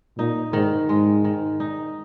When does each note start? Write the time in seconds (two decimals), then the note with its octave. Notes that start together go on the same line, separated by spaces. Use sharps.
0.18 A#2 D#4
0.53 G#2 D#3
0.89 G#2 G#3
1.24 D#3
1.60 D#4